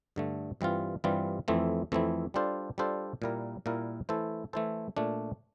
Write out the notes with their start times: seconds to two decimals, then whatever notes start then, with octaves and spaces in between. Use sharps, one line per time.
0.16 G2 D3 A3
0.61 G2 E3 G3 C4 F4
1.04 G2 E3 G3 C4 F4
1.48 F2 E3 A3 C4 E4
1.92 F2 E3 A3 C4 E4
2.34 G3 D4 F4 A4 C5
2.78 G3 D4 F4 A4 C5
3.22 A#2 G3 A#3 E4 A#4
3.66 A#2 G3 A#3 E4 A#4
4.09 E3 A3 E4 A4 C5
4.53 E3 A3 E4 A4 C5
4.97 A#2 A3 D4